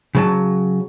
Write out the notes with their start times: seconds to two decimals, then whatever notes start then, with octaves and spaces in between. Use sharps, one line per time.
0.15 C#3 F#3 A5